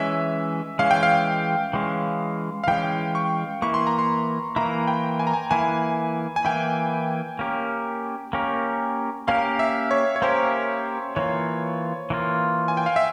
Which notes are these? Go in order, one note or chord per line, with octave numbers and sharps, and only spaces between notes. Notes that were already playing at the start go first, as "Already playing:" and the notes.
Already playing: E3 G#3 C#4 E5
E3 G#3 C#4 F5
G5
F5
E3 G#3 C#4
F5
E3 G#3 C#4 G5
C#6
E3 A#3 E4 C#6
C6
A#5
C6
E3 A#3 E4 A#5
G5
G#5
A#5
G#5
E3 A#3 E4 G#5
G#5
E3 A#3 E4 G5
A#3 C#4 G4 A#4
A#3 C#4 G4 A#4
A#3 C#4 G4 A#4 F5
E5
C#5
C#5
A#3 C#4 G4 A#4 C5
E3 A#3 F4 C#5
E3 A#3 F4
G#5
G5
F5
E5